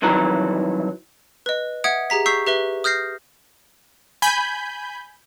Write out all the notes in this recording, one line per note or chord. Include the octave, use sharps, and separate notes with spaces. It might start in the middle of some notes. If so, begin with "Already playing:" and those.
C2 D#3 E3 F#3 A#5
B4 D#5
E5 F#5 D#6 G#6 C#7 D7
G4 G#4 A#5 B6
C#6 E6 G6 B6 C7
G4 B4 E5 G7
D#6 F6 G6 A#6 C7
G#5 B5 G6